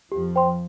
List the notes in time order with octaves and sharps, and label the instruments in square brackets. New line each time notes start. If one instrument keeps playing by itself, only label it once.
[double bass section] F2 F3 [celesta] G4
[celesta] C5 G5 C6